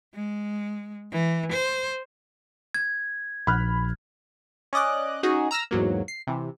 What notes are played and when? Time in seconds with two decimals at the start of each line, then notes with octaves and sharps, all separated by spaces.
0.14 G#3
1.12 E3
1.52 C5
2.74 G#6
3.47 A#1 B5 F6 F#6
4.73 C#4 D5 D#5 D6 F#6
5.23 C#4 D#4 F#4 G#4
5.51 A#5 E6 F6 A#6
5.71 E2 G#2 F#3 A#3
6.08 C7
6.27 C3 E3